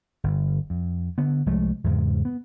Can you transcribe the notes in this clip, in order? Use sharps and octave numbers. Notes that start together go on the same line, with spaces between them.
G1
F2
D3 B3
C2 F3 G#3 A3
E2 G#2 C#3
B3